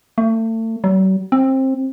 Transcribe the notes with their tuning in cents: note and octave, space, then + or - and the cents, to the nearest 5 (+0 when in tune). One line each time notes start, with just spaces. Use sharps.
A3 +35
F#3 +45
C4 +20